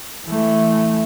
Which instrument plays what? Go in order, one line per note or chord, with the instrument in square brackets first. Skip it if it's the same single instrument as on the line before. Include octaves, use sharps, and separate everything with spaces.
[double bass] E3 A3